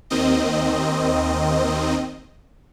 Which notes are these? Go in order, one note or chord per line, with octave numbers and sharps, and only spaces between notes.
D#2 D#3 C4 D#5